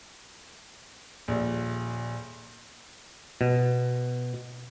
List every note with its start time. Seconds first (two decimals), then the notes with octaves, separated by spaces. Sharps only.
1.28 D#1 A#1
3.41 B2